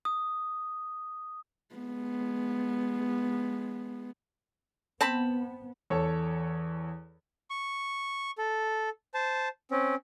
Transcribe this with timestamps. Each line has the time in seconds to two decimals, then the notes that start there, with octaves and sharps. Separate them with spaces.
0.05 D#6
1.75 G#3 B3
5.01 B3 C4 A5 B5
5.90 E2 A4 C#5
7.50 C#6
8.38 A4
9.14 C5 A5
9.71 C4 C#4